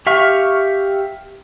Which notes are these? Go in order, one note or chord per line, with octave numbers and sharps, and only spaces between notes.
G4 E5 F5 C#6